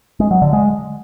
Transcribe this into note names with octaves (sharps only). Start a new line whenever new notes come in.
G#3
F#3
D3
G#3